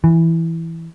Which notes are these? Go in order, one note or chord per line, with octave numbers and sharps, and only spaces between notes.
E3